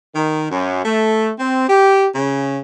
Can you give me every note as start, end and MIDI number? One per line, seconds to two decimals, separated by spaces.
0.15 0.48 51
0.51 0.82 42
0.85 1.31 57
1.39 1.65 60
1.68 2.06 67
2.14 2.59 49